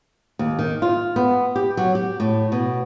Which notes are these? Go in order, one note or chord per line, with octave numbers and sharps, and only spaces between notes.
D#2
D#3
F4
B3
G4
F#3
G4
A2
B2